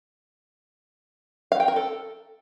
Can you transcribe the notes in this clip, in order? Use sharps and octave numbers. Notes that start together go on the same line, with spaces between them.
F5
G5
A#4
A4